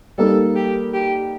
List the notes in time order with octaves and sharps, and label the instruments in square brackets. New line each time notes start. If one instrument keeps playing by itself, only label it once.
[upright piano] G3 A#3 D#4 A#4 [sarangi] A4
[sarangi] G4
G4